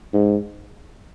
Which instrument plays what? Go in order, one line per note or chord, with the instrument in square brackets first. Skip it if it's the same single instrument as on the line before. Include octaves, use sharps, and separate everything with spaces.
[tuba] G#2